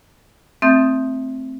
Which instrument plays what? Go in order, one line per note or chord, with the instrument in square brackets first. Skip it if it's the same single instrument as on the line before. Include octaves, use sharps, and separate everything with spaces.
[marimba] A3 C4 E5 D#6 G6 A6